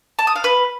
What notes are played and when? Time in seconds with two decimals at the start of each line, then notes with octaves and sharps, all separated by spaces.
0.19 A5
0.27 D#6
0.36 F5
0.44 B4